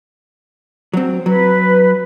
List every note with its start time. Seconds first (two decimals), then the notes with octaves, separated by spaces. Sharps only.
0.94 F#3 C4
1.26 F#3 B4